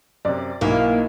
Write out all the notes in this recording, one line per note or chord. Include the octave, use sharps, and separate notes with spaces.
F#2 C3 D5
B1 A#3 D#4 E4